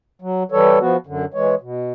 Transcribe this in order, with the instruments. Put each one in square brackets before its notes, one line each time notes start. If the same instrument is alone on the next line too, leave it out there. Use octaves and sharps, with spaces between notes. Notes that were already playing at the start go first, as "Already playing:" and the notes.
[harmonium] F#3
E3 G3 A4 C#5
F3 B3 F#4
F#2 D3
E3 G#3 C#5
B2